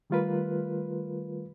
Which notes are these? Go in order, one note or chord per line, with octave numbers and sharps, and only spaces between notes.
D#3 G3 A3 F4 A#4 B4